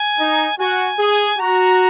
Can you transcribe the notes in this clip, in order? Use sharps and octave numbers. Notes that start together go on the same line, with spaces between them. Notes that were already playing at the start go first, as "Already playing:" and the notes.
Already playing: G#5
D#4
F#4 G#5
G#4
F#4 A#5